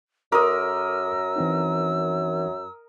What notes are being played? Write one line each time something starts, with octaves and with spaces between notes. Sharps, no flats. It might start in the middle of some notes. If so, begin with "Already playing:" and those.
F#2 A4 A#4 D#5 C6 D6 E6
E3 C4 D#4